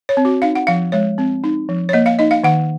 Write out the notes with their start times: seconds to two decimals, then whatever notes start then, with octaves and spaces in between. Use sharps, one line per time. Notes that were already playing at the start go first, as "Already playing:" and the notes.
0.09 C#5
0.17 C4
0.25 F#4
0.42 D#4 F5
0.55 F#5
0.67 F3 F5
0.92 G#3 C#5
1.18 C4
1.44 D#4
1.69 F3
1.89 C#5
1.93 A#3 D#5
2.06 F5
2.19 D#4 D#5
2.31 F5
2.44 D#3 F#5